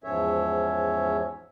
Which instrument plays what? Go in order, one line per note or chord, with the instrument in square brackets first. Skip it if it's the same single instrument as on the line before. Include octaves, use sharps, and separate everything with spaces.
[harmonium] E2 G#2 F3 C#4 C#5 E5